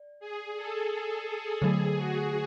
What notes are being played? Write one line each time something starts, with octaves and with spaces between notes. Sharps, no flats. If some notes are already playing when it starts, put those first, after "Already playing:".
Already playing: D5
G#4
A4
D3 F#3 A3 G#4
F#4